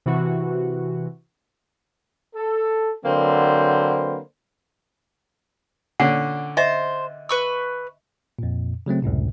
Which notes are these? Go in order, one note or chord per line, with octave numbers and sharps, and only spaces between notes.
C3 E3 F#4
A4
D3 F#3 A#3 C4 B4 C5
A#2 D3 C#4 F#5
C5 D#5 E5
B4 C#6 E6
F2 A#2
C#3 F#3 A3 C4
C#2 F#2 A2 C3